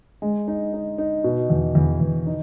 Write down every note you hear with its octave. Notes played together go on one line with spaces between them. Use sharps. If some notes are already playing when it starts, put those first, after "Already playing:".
G#3
D#4
D#4
D#4
B2
E2
E2
E2
D#4